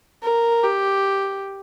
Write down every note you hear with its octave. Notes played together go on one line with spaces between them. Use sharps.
A#4
G4